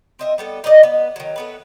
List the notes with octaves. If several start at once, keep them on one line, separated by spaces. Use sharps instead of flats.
C4 D#5 E5
G3 B3 A4
D#4 B4 D5 D#5
B3
D#3 F#3
A3 B3 B4